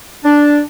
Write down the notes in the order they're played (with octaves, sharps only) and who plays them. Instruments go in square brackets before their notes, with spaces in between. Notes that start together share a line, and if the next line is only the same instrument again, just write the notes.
[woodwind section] D4